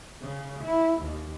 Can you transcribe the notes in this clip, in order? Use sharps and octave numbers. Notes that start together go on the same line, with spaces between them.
C#3
E4
D#2